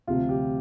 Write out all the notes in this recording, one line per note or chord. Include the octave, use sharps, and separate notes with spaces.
D2 C3 F3 F4
G4